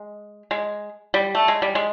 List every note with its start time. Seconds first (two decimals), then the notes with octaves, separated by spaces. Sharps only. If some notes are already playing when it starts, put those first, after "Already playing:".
Already playing: G#3
0.51 G#3
1.14 G3
1.35 A3
1.48 G#3
1.62 G3
1.75 G#3